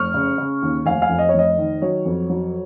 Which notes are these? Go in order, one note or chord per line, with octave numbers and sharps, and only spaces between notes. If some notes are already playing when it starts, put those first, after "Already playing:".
Already playing: F1 C#6 F6
C#3
C#3
D#2
F1 F5 G#5
F5 G#5
F2
D#5
C#5
F1 D#5
D#3
F#3 C#5
F2
F#3